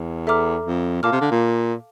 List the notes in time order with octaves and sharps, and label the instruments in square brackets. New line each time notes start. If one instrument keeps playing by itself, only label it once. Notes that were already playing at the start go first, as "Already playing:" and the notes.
Already playing: [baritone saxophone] E2
[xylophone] A4 E5 A#5 D6 F6
[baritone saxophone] F2
[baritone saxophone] A#2 [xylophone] F5 A5 D6 F6
[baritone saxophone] C3
D3
A#2